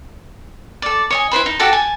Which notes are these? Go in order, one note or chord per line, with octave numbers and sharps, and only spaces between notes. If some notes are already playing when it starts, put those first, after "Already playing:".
A4 D5
C#5 D#5 G#5
E4 B4 C5 B5
D#4
F#4 G4 A4 A5
G#5 A5